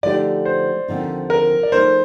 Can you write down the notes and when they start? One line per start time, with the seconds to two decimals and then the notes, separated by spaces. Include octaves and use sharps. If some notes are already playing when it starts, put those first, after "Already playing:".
0.03 D3 F3 A3 D#4 G4 D5
0.45 C5
0.88 D#2 D3 F3 C4 D#4
1.30 A#4
1.63 D5
1.72 F3 A3 D#4 A#4 C5